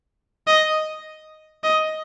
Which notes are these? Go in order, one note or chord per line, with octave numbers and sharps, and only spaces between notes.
D#5
D#5